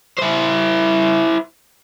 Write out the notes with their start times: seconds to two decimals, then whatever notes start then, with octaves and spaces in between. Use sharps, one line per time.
0.19 E4 C5